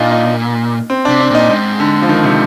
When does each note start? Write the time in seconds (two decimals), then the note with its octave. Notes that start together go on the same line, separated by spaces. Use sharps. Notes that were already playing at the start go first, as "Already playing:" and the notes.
Already playing: A#2 A#3 D4 D#4 F4
0.11 D#4
0.90 C4
1.05 D4
1.09 C3
1.20 D4
1.30 A#2 D#4
1.50 G#2 C4
1.80 D3
2.02 F3
2.09 D#3
2.24 C3